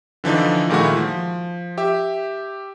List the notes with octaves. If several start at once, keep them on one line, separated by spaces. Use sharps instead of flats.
D3 E3 F3 D4 D#4
A#2 D#3 G#3 A3 E4 F#4
F3
G4 E5